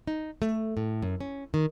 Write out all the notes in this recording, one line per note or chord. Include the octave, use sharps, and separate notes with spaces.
D#4
A3
A2
F#2
C#4
D#3